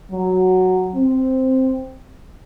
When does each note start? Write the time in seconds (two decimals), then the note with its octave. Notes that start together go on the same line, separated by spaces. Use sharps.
0.12 F#3
0.95 C4